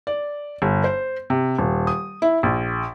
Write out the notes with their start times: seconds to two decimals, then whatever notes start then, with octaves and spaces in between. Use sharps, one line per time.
0.07 D5
0.62 G1
0.84 C5
1.30 C3
1.58 D#1
1.87 D#6
2.22 E4
2.43 A#1